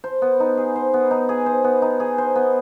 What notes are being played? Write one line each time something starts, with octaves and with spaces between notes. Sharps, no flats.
C5
B3
D#4
G#4
C5
B3
D#4
G#4
C5
B3
D#4
G#4
C5
B3